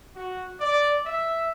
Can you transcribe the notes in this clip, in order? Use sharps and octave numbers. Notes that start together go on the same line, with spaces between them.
F#4
D5
E5